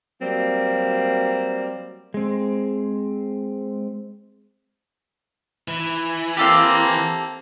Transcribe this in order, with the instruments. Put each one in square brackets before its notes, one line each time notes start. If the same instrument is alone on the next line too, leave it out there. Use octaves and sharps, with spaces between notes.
[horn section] F#3 G3 A#3 C4
[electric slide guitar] G#3 C4
[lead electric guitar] E3
[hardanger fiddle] A#3 C4 [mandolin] G4 A4 F5